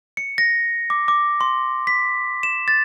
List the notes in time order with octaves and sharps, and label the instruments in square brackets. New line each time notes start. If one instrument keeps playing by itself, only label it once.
[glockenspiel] C#7
A#6
D6
D6
C6
B6
E7
A6